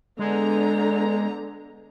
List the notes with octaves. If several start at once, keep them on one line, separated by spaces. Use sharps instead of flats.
D3 G#3 B3 A#5